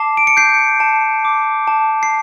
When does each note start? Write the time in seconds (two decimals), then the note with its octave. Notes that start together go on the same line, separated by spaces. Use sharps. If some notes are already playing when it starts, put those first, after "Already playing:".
Already playing: A5 D6 C7
0.17 D7
0.27 C#7
0.37 G6 C7
0.80 A5
1.25 D6
1.68 A5
2.03 C7